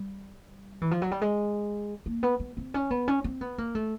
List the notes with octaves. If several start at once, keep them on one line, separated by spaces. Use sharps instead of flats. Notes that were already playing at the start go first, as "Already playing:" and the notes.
Already playing: G3
E3
F3
F#3
G3
G#3
A#3
B3
B3
C4
C#4
B3
C#4
C4
B3
A#3
A3